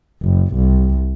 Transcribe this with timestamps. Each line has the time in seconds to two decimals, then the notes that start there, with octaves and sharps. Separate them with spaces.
0.22 F#1
0.55 C2